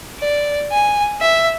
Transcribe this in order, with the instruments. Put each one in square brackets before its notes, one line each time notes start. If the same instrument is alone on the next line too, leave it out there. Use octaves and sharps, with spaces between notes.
[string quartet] D5
G#5
E5